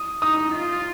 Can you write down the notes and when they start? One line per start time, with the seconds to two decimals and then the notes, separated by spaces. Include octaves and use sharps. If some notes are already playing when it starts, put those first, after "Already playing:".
Already playing: D#6
0.22 D#4 D#6
0.55 F4